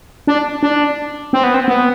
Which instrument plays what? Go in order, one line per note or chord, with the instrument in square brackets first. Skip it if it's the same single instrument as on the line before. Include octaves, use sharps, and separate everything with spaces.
[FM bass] D4
D4
C4
B3
C4
B3